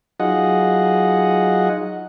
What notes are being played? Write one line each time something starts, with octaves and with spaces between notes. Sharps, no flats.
F#3 D#4 F4 G#4 D#5 F#5